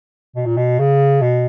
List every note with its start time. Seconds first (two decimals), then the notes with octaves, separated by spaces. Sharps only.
0.36 B2
0.46 A#2
0.57 B2
0.79 C#3
1.21 B2